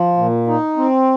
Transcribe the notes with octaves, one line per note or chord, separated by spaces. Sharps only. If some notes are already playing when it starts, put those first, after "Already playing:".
Already playing: F3
A#2
D#4
C4